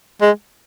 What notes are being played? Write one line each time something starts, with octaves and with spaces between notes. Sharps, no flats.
G#3